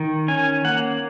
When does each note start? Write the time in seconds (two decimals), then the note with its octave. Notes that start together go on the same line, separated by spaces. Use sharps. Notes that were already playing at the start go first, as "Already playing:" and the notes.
Already playing: D#3
0.28 C#4 G#5
0.65 A#3 F#5